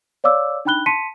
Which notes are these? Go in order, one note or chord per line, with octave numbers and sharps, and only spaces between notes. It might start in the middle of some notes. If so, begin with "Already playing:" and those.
C#5 D5 F5 D6 E6
D4 D#4 G5 B5 F#6 G7
A5 C6 B6 C#7 D#7